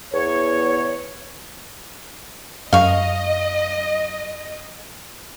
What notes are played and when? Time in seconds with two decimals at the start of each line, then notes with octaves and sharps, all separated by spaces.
0.13 E2 C#5
2.73 F#2 D#5 F5 C#6